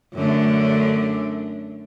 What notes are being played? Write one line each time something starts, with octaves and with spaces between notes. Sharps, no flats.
F#2 D3 A3